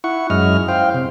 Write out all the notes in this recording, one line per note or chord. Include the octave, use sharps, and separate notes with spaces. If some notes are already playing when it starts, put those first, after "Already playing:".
E4 F#5 C#6
F#2 G#3 E4 D#5 F6
C5 F5 G5
C3